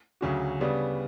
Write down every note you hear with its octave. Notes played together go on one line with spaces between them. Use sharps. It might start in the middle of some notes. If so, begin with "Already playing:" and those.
D2 C#3 F#3 C#4 F#4
C#3 G3 B3 D4